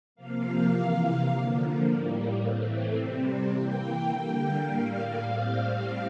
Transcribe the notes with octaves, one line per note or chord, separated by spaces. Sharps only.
C3 F3 A#3 F5
C3 E3 A#3
D3 F3 A#3
A2 G3 A#3
A2 E3 A3 C4
C3 G3 C4
E3 A#3 G5
D3 G3 A#3
A2 G3 A#3 F5
A2 G3 C4